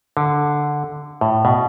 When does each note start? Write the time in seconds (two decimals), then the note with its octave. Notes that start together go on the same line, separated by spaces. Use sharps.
0.17 D3
1.21 A2
1.45 B2